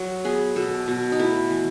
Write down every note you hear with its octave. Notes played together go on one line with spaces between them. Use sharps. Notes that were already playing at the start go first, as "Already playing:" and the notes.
Already playing: F#3
B3 G#4
B2 A4
B2
D#4
A3 E4
E3